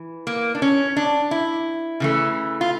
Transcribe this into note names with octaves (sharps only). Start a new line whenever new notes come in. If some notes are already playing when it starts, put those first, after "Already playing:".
Already playing: E3
A#3
D4
C#4
D4
E4
C#3 E3 A3
F4